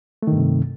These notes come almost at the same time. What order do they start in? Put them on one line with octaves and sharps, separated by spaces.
A3 D#3 G2 C3